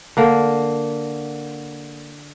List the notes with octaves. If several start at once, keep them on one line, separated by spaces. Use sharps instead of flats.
D3 A#3